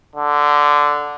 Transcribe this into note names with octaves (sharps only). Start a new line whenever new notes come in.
D3